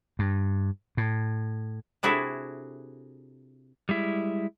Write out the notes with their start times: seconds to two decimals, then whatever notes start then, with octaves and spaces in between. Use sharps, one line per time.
0.19 G2
0.97 A2
2.03 C3 D4 E4 F#4 G#4 A4
3.89 G3 G#3 E4